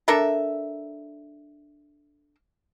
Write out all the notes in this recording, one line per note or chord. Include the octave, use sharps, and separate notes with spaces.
D4 A4 A#4 E5